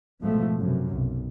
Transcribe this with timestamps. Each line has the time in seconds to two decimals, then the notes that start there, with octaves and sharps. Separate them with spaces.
0.20 G#1 G#2 B2 F3 A3
0.58 F#2 C3
0.91 B1